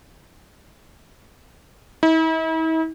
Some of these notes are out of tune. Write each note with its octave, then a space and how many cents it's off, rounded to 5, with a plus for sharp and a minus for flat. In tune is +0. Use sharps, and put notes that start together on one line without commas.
E4 -45